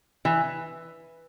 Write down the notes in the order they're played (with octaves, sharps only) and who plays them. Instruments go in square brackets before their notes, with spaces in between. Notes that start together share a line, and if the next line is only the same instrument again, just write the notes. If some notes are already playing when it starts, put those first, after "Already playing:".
[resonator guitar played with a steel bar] E3